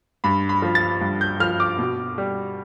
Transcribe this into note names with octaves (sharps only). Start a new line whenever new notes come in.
G2 B5
B5
F3
A6
G2
G6
F3 F6
D6
B2
G3